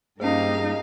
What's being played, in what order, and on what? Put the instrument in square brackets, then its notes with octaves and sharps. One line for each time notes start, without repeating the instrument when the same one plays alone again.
[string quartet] G2 G4 F5 [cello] A#3 D#4 [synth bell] C#4 G#4